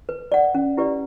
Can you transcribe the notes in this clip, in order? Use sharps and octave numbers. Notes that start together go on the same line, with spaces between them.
B4
D5 F#5
C#4
E4 G4 B4 D5